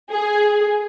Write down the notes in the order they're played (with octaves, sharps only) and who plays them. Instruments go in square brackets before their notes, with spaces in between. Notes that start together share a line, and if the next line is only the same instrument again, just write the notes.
[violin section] G#4